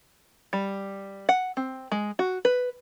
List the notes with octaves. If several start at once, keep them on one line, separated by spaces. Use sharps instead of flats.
G3
F#5
C4
G#3
F#4
B4